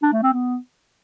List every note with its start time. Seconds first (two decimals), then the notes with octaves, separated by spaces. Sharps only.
0.02 D4
0.13 A3
0.23 C4
0.33 B3